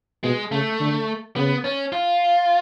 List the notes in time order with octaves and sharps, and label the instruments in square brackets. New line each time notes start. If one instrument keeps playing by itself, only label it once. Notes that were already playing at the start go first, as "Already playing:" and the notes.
[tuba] B2 [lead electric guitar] G#3
[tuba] C#3 [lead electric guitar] A3
[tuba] D3
[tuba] C#3 [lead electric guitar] B3
[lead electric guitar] C#4
F4